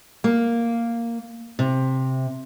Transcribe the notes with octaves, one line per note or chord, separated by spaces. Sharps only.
A#3
C3